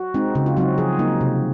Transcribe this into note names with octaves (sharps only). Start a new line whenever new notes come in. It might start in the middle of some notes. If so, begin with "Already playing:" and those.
Already playing: F#4
G#3 C4 D#4
C#3 F#4
F4
F#3 C4 D#4 F#4
F3 G#4
A#3 D#4
C3